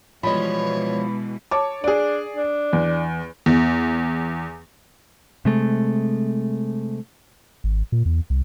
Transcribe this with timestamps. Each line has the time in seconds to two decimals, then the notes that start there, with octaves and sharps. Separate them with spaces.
0.23 B2 E3 F3 G3 G#3 C#5 D#5 B5
1.51 C#5 A5 D6
1.84 D4 G#4 D5
2.36 D4
2.73 E2
3.46 E2
5.45 C3 G#3 A3
7.64 G#1
7.92 A#2
8.06 E2
8.30 C2